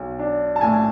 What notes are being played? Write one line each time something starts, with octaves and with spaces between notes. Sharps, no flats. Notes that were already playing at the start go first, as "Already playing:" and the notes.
Already playing: B1
D4
A5
A2 G#5